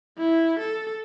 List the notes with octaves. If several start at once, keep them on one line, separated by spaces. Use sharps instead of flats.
E4
A4